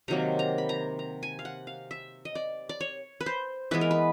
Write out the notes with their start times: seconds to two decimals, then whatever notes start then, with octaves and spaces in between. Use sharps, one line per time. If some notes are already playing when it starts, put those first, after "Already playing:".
0.08 C3 D#3 F#3 A#3 A#5
0.39 A#5
0.58 B5
0.69 A#5
0.99 A#5
1.23 G#5
1.39 F5
1.45 F#5
1.67 F5
1.91 E5
2.25 D#5
2.35 D5
2.69 D5
2.81 C#5
3.21 B4
3.26 C5
3.71 E3 G#3 B3 B4
3.81 A#4
3.91 B4